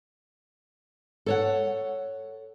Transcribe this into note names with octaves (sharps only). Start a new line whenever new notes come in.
A4 C#5 F#5